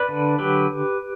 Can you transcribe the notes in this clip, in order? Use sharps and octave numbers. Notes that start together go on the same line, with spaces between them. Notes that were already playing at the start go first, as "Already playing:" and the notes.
Already playing: B4 D5
D3
F#3 G4 B4